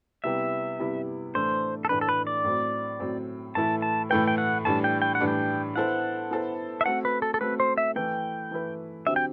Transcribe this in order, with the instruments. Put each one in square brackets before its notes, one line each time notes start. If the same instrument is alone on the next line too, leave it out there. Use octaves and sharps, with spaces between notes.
[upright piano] C3 G3 B3 E4 G4 [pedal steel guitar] E5
[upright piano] C3 G3 B3 E4 G4
[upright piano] A2 E3 A3 D4 [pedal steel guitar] C5
[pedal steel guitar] A4
[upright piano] A2 E3 A3 D4 [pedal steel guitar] B4
[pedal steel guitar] A4
B4
D5
[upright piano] A2 F#3 C4
A2 F#3 C4
[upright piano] A2 E3 A3 E4 B4 [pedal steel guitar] A5
[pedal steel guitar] A5
[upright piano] A2 E3 A3 E4 B4 [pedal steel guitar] G5
[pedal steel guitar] G5
F#5
[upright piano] A2 E3 G3 D4 [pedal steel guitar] A5
[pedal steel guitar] G5
G5
F#5
[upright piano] A2 E3 G3 D4
[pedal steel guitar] G5
[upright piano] B3 E4 A4 C5 [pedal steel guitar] F#5
[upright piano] B3 E4 A4 C5
[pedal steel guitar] E5
[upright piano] A3 C4 F#4 [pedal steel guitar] F#5
[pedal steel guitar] B4
A4
A4
[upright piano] A3 C4 F#4 [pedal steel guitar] B4
[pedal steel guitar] C5
E5
[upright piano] E3 A3 E4 B4 [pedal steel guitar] G5
[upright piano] E3 A3 E4 B4
[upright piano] D3 F#3 C4 G4 [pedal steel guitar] E5
[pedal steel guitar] G5